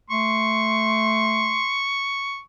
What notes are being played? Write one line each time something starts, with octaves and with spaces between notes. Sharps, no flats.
A3 C6 C#6